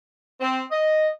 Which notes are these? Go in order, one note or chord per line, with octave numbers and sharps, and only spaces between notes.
C4
D#5